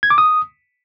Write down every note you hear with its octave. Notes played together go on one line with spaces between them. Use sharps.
G#6
D6
D#6